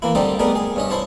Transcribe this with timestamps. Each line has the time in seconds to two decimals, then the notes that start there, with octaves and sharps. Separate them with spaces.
0.02 E3 A#3 E4
0.15 D3 G3 C4 D#4 A4
0.39 G3 A3 B3 G#4 A#4
0.55 G#4
0.76 G2 C#4 D#5
0.90 E4 C5 C#5 A5